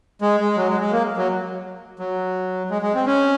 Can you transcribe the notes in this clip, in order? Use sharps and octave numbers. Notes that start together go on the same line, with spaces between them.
G#3
G#3
F#3
G#3
G#3
A#3
F#3
F#3
G#3
G#3
C4
C#4